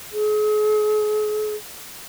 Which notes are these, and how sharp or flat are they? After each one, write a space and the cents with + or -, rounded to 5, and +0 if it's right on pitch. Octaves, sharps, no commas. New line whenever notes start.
G#4 +40